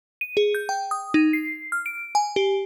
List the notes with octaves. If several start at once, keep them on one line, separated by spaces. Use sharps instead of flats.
D#7
G#4
G6
G5
D#6
D#4
C7
F6
D7
G#5
G4